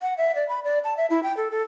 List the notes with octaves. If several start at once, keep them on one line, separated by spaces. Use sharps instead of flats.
F#5
E5
D5
B5
D5
A5
E5
E4
G5
A4
A4